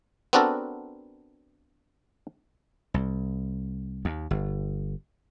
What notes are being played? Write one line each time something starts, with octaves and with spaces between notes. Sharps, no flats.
B3 C4 D4 F#4 A4 A#4
C2
D#2
G1